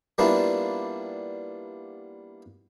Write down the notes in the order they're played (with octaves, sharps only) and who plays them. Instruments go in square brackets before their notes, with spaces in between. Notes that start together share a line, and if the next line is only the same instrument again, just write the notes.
[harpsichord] G3 A#3 B3 D4 E4 F4